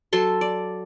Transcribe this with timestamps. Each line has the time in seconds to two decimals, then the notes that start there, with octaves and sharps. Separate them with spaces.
0.13 F#3 A4 C6
0.41 D5